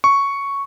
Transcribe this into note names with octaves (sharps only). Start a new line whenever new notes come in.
C#6